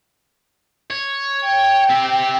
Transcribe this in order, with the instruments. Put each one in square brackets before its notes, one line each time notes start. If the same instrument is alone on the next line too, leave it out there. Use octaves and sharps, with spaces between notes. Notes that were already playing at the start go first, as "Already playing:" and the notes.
[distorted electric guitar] C#5
[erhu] G5
[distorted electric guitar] C4 G4